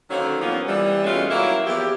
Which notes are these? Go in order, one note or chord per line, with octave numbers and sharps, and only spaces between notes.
D3 D#3 F#3 A#3 C#4 C5
G2 A#2 F3 A#3 B3 C#4
E3 G3
B2 E3 G#3 A3 C#4 F4
F#3 A#3 E4
E2 F3 E4 G4